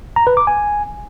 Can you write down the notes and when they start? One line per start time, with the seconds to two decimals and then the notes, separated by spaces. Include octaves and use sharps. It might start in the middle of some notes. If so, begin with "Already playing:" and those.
0.16 A#5
0.27 B4
0.37 D6
0.47 G#5